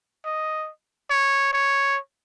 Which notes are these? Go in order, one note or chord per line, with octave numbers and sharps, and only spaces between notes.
D#5
C#5
C#5